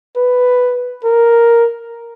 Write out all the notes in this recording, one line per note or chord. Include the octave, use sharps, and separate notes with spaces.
B4
A#4